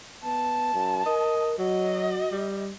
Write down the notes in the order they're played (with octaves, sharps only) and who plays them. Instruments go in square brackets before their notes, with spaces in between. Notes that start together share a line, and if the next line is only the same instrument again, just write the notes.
[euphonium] B3 [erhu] A5
[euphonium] F#2
[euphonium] A#4 [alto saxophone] D#5
[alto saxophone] F#3 [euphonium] F#4 [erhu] D#5
[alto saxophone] G3